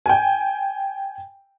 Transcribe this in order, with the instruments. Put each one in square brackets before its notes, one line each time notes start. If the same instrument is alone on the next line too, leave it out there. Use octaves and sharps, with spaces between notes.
[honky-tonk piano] G5 G#5